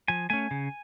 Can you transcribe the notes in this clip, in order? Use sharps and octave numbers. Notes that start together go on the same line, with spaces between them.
F3 G#5
A3 C#4 G#5
C#3